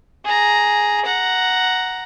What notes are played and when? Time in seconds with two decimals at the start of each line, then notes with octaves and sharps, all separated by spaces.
0.25 G#4 A#5
1.05 F#5 A#5